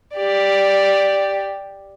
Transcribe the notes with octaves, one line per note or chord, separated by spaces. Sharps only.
G4 D5